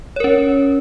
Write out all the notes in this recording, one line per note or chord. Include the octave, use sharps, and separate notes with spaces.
C#4 A#4 C#5